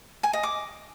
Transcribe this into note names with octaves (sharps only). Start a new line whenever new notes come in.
G#5
D#5
D6